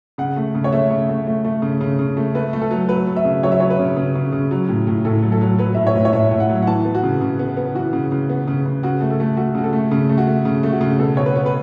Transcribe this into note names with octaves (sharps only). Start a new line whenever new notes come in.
C#3 F#5
A3
C#3
C#5
A3 E5
C#3
A3
A3
A3
C#3
C#3
C#3
A3
A3 B4
A3
A4
F#3
F#3 B4
F#3
E5
C#3
F#3 C#5
E5
F#3 C#5
B4
C#3
C#3
C#3
C#3
F#3
A2
A2
A2 A4
F#3
A4
F#3
F#3 B4
A2 E5
C#5
A2
C#5
A2 E5
A2
F#5
F#3
F#5
E3 A5
B3
F#4
C#3
C#3
B3
B3
E3 F#4
C#3
C#3
B3
C#3
C#3
C#3 F#4
A3
A4
A3
A3 F#4
C#3 F#4
A4
A3
C#3
A3
F#4
A3
C#3
A3
F#4
C#3
B2 A4
B2 C#5
B4
B3
B4